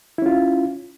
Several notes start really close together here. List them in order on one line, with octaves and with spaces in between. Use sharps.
E4 C#4 F4